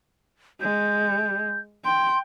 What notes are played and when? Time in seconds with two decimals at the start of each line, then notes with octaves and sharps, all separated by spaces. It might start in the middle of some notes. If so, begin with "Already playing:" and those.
0.61 G#3 G6
1.85 G5 C6